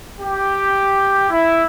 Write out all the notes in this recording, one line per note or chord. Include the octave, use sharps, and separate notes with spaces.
G4
E4